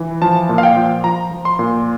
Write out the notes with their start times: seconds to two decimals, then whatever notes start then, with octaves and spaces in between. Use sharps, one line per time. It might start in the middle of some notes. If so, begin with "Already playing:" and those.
Already playing: E3
0.22 F3 A5
0.49 A#2
0.58 F5
0.63 G5
0.76 F3
1.04 F3 A#5
1.31 F3
1.45 C6
1.59 A#2